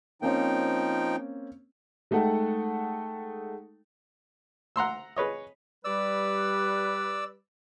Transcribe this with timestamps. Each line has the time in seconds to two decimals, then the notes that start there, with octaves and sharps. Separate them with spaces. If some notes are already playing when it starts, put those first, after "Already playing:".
0.22 F3 A#3 C4 C#4 D#4 G5
2.11 G#3 A3 D#4 A4 F#5 G5
4.76 F#5 A#5 C6 E6
5.16 G#4 B4 C#5 D#5
5.85 G3 B4 D5 E6